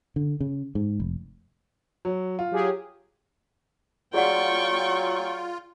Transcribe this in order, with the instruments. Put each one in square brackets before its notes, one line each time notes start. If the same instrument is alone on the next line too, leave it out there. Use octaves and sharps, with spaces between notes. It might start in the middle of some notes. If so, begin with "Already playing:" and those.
[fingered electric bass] D3
C#3
G#2
F1
[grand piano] F#3
F4
[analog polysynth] F#3 G4 G#4
[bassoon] F#3 [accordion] F4 [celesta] G#4 D5 F#5 [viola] G5 C#6